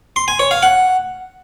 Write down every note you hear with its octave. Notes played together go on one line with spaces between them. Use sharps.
C6
G#5
C#5
F5
F#5